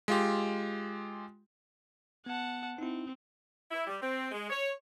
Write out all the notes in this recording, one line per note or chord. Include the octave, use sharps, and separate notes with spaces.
G#3 F4 G4
B3 F#5 A5
C4 D#4 E4
E4
G3
C4
G#3
C#5